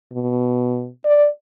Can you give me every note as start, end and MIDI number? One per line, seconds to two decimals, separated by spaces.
0.13 0.88 47
1.05 1.28 74